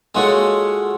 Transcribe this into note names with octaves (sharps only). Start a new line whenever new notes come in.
G#3 A3 F4 F#4 C#5